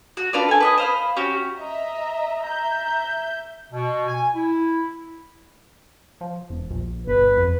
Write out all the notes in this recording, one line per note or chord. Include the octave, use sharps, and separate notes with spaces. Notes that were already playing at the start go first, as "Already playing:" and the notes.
F#4
D4 F4 B4 D5
A4 G#5
B4 D5 D#5
C5 F5 B5
C#4 F#4 G4
D#5 E5 A#5
E5 A#5 G6
B2
G#5
E4
F3
E1
A#1
G1 B4
F2